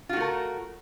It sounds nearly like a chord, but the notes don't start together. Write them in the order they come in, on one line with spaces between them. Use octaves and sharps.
F4 F#4 A3 A#4